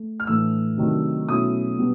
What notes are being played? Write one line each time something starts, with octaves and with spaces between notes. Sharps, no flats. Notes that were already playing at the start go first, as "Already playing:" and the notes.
Already playing: A3
F6
A2 E3 A3 D4 E6
C3 D#3 F#3 A3 D4
B2 F#3 A3 C#4 E4 D#6
B2 G3 B3 D4